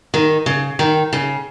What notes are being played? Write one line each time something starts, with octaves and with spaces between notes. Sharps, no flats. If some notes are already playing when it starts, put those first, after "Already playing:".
D#3
C#3
D#3
C#3